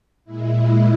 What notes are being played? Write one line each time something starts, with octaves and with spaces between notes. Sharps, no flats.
A#2 G#3 E4